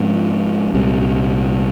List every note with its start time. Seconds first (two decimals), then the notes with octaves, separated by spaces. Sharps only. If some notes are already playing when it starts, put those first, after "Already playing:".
Already playing: G#2 F3 C4
0.74 C2 A#2 G3 C4